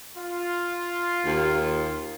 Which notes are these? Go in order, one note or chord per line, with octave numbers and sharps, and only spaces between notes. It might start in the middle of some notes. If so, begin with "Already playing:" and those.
F4
D#2